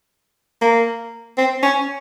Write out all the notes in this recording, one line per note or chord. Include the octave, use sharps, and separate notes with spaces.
A#3
C4
C#4